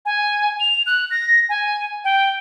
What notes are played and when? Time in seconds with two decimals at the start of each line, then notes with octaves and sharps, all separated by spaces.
0.06 G#5
0.60 F7
0.86 F#6
1.11 A#6
1.49 G#5
2.04 G5